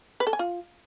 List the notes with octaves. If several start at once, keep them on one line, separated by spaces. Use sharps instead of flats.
B4
A4
G#5
F4